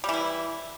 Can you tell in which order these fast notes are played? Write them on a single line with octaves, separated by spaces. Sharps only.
G3 E3 E4